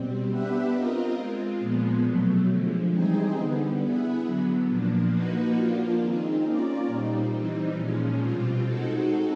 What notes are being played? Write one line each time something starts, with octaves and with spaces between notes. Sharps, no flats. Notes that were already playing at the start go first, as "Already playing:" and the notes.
Already playing: B2 G3 C4
B3 D4 G4 B4 E5
C4 F4 A#4 D#5
G#3 C4 F4
A#2 F3 G#3 B3
B2 F#3 A3
D3 F3 G#3
E3 G3 C4 D#4 G#4
D3 G3 B3
B3 E4 G#4 B4
D3 F#3 B3
A#2 F3 A#3 D4
F3 A#3 D#4 F#4 B4
F3 A#3 D4 F4
D#3 G#3 C4 D#4
A#3 C#4 F4 A#4 D5
A#2 G3 C4 D#4
E3 G3 C4 D#4
A#2 F3 G#3 C#4
B2 G3 C4 F4
G#3 C4 D#4 F#4 A4